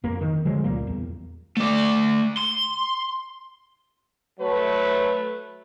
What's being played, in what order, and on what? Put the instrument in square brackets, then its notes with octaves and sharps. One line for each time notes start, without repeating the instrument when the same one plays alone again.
[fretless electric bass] F2 A#3
D#3
D3 F3 F#3 G#3
C#2 A#2 G3 A#3
E2
[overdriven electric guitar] A3 D5
C6
[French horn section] F#3 A3 B4